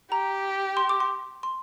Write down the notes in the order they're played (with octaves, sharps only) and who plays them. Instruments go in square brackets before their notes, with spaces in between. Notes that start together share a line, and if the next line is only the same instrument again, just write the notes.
[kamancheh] G4 [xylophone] A#5
[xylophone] C6
D6
C6
C6